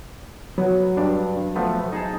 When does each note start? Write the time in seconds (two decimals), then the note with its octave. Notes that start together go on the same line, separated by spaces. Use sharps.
0.58 F#3 B3
0.97 G2 D4
1.56 F3 A3 B3
1.92 D#4 G#4 A5